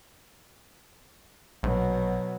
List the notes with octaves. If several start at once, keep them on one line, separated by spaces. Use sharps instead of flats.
A#1 B2 F#3